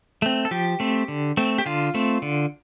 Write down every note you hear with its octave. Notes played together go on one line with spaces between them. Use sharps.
A3 C4
A4
F3 G4
A3 C4
D3
A3 C4
G4
D3 F4
A3 C4
D3